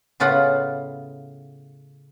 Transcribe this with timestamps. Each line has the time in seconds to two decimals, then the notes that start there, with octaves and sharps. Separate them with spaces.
0.20 A2 C#3 B3 F4 F#5